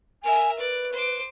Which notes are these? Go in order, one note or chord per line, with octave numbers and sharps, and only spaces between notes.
A#4 E5 G#5
B4 D5
C5 D6